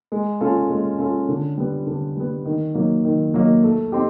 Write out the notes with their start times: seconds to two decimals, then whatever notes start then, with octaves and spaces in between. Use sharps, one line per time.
0.12 G#3
0.41 C#4 F4 A4
0.70 G#3
0.99 C#4 F4 A4
1.29 D3
1.58 G3 B3
1.87 D3
2.17 G3 B3
2.45 D#3
2.74 F#3 A#3 D#4
3.05 D#3
3.34 F#3 A#3 D#4
3.63 A3
3.92 C4 D#4 G4